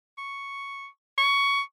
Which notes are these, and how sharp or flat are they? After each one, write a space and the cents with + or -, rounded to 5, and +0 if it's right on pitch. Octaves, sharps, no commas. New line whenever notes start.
C#6 +0
C#6 +15